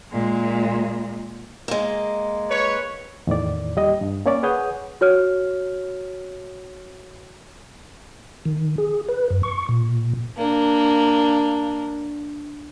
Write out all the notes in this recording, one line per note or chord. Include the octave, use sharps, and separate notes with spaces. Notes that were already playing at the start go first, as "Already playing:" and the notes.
A#2 G#3
G#3 A#3
B4 C#5
E2 A2 D#3 D5
D#2 G3 G4 D#5
G2
A#3 C#4 C#5 D5
G#4 B4 C#5 F#5 D#6 G6
F#4 C#5 F6
D#3
G#4
B4
F#2
C#6
A#2
A#3 D4